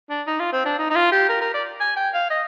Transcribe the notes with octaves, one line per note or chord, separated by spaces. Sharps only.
D4
D#4
F4
C4
D4
D#4
D#4
F4
G4
A#4
A#4
D5
G#5
G5
F5
D#5